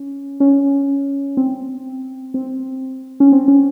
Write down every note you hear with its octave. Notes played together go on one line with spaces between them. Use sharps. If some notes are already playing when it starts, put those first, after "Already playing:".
Already playing: C#4
C#4
C4
C4
C#4
C4
C#4